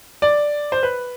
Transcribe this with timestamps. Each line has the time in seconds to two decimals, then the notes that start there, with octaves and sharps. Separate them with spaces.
0.22 D5
0.72 C5
0.83 B4